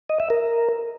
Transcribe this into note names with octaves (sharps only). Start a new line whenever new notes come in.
D#5
E5
A#4